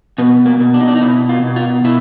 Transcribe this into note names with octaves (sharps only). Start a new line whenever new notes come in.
B2 B3
A#3
B2
D4
D#4
D4
D#4
B2 E4
F4
B2
F4
B2 E4